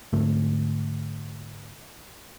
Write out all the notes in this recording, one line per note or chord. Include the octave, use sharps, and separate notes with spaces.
G#2 D3 A3